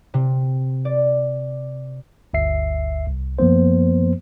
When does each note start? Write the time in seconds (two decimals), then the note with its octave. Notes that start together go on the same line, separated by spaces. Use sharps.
0.14 C3
0.85 D5
2.34 G1 D2 E5 C7
3.07 C2
3.39 F#2 F3 A#3 B3 C5